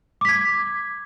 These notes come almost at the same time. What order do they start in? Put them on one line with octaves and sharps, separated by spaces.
D6 B6 G#6